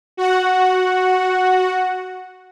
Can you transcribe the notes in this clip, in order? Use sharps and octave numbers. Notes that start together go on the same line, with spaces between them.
F#4 F#5